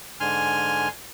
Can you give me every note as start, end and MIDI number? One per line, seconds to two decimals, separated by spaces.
0.20 0.88 44
0.20 0.88 50
0.20 0.88 80
0.20 0.88 84
0.20 0.88 89